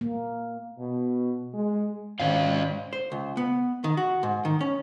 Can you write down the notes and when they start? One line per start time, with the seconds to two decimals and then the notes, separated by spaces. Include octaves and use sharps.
0.01 A#3
0.79 B2
1.54 G#3
2.20 G#1 C#4 D#5 F5
2.93 C5
3.12 C#2
3.37 B3
3.84 D#3
3.97 F#4
4.23 G#2
4.45 D#3
4.61 C#4